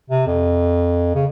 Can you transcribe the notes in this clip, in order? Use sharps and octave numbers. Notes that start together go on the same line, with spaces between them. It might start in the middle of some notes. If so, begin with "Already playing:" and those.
C3
F2
C#3